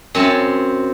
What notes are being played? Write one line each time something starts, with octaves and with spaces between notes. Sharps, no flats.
F#2 C4 C#5 G#5 A5 B5